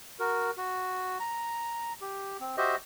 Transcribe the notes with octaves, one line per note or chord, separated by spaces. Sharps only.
F#4 A#4
F#4
A#5
G4
C4
F#4 G4 C5 D#5 E5